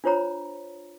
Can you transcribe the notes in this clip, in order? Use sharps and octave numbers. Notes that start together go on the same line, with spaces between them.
D4 F4 C5 C#5 A#5 B5